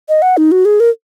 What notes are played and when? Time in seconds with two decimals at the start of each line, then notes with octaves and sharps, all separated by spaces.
0.09 D#5
0.22 F#5
0.37 D#4
0.52 F#4
0.65 G#4
0.80 A#4